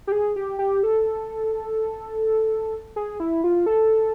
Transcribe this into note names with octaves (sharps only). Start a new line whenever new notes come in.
G4
G#4
G4
G4
A4
G#4
E4
F4
A4